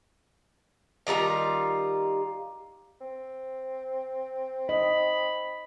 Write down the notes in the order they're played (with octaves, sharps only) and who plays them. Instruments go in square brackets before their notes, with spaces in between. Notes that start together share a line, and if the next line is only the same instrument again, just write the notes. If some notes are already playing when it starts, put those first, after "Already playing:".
[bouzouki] D#3 G3 F4 A#5
[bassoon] C4
[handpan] D#5 [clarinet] B5